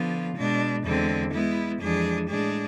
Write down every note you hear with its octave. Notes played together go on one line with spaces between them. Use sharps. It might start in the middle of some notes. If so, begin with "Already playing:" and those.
Already playing: D3 F3 B3 F4
B2 G#3 D4
E2 D3 G#3 C4
G#3 B3 E4
F2 E3 G#3 D4 G#4
A2 G#3 D4 G#4